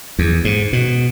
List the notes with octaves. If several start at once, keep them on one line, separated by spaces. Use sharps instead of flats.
E2
G#2
B2